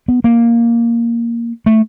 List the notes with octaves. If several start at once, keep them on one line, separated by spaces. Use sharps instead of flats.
B3
A#3
A3